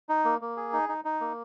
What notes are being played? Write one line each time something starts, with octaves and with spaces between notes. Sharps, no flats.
D#4
A#3
A#3
G#4
D#4
D#4
D#4
A#3